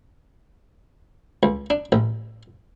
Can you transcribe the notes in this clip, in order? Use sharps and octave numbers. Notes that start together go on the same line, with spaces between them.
C#2
D4
A1